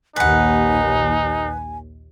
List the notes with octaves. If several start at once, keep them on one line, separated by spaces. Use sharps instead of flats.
A#1 D#2 D#4 B4 F#5 G#5